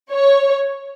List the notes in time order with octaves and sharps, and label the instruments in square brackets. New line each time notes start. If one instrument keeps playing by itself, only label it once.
[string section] C#5